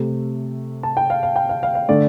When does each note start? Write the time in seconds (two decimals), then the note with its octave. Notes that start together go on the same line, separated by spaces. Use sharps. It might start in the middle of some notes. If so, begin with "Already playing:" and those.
Already playing: C3 A3
0.83 A5
0.97 G5
1.10 F5
1.23 F5
1.36 G5
1.49 F5
1.63 F5
1.75 F5
1.89 D3 A3 D5